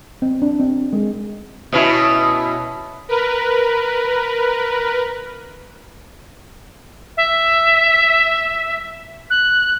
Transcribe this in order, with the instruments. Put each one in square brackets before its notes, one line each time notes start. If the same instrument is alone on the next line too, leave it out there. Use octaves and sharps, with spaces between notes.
[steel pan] C4
D4
C4
G#3
[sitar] B2 C#4 E4
[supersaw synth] A#4 B4
[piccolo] E5
F#6